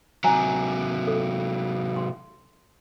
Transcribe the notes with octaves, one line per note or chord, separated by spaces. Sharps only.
C3 F#3 G#5 A#5
A4
C6